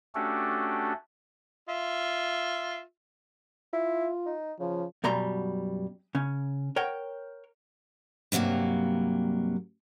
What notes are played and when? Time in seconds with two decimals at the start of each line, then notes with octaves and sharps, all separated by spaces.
0.15 A3 C#4 D4 F#4 G4 A4
1.69 F4 E5
3.73 E4 F4
4.26 D#4
4.60 C#3 F3
5.04 F#2 B2 G3 A#5 C6
6.15 C#3 C#4
6.76 A#4 C#5 F#5 G5
8.32 G2 C3 F#3 G#3 A#3